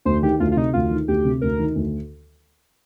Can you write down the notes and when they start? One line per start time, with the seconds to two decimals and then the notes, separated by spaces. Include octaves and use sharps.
0.05 D2 C5
0.22 D#3 G4
0.40 D2 F4
0.52 F4
0.57 C3 D#4
0.73 D2 F4
0.91 D#3
1.08 D2 G4
1.25 C3
1.41 D2 A#4
1.59 D#3
1.75 D2